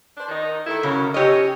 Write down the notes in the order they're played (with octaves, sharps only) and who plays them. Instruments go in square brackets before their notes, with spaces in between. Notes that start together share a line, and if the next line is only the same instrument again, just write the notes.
[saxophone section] D4 C5
D#3 D#4
D#3 E4 A4
[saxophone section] F#2 C#4 [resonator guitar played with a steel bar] C#3
[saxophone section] C#4 A#4 C#5 [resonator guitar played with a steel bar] G4 D#5